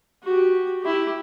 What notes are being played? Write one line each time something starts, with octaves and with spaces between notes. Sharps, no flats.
F#4 G4
E4 G4